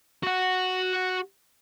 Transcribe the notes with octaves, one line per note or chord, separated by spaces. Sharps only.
F#4 F#5